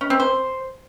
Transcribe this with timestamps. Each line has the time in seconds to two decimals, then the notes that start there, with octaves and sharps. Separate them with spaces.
0.01 C#4
0.10 C4
0.20 C5